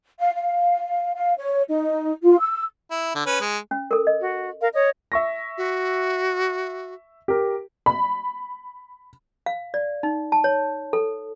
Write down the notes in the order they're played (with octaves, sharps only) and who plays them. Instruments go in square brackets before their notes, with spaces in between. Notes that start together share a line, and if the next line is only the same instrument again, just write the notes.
[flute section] F5
F5
F5
C#5
D#4
F4
E6
[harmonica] E4
D3
C#4 B4
G#3
[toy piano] C#4
A4 A#4
D#5
[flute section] F#4
A#4 F5
C#5 D#5 D#6
[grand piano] E5 C#6 A#6
[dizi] F#4
[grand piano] G4 A#4
[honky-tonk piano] B5
[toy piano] F5
D5
D#4
A5
C#5
A4